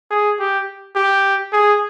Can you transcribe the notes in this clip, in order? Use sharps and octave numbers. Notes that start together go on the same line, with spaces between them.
G#4
G4
G4
G#4